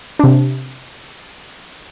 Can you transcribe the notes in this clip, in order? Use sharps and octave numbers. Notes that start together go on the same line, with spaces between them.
C3 D4